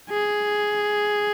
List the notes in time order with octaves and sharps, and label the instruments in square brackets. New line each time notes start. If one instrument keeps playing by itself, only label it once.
[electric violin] G#4